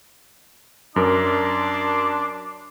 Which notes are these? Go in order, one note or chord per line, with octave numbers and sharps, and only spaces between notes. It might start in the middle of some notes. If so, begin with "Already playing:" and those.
F#2 D4 A#4 C6 D6